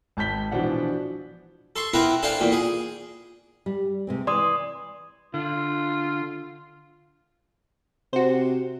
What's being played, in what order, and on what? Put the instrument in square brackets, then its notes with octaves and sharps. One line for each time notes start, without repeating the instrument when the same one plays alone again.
[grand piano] G#1 A5 G6 B6 G7
B2 E3 F3 D4 F#5
[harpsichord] A4 C6 C#6
B3 C4 E4 A#4 F#5
D4 A4 C5 F5 G5 G#5
E2 A#2
G#4
[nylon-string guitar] G3
C3 G#3 C4
[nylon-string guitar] E3 [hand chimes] D5 C6 D#6
[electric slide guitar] D3 [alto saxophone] F4
[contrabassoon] C3 [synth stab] F#4 C5